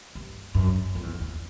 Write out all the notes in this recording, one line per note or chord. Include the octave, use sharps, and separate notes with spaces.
G2
F#2
F2
E2
E2